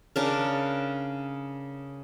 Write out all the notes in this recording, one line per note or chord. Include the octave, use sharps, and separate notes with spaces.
C#3 D4 A#4